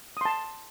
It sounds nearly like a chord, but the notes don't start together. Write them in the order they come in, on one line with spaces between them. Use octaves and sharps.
D#6 C6 A5